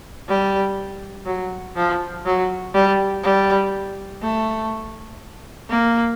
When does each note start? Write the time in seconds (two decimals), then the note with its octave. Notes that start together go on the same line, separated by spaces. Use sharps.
0.28 G3
1.26 F#3
1.76 F3
2.26 F#3
2.74 G3
3.23 G3
4.22 A3
5.70 A#3